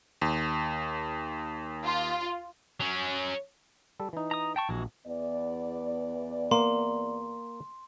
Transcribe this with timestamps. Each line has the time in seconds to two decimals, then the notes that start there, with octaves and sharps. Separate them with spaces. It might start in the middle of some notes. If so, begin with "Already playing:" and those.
0.22 D#2
1.85 F4
2.80 F#3 C#4
4.00 G3 A4
4.13 E3 D#4
4.31 A#5 D#6
4.56 G5 A5 C#6
4.69 A#1 E3 G#3 F#4
5.07 E2 B3 D5
6.51 A#3 C6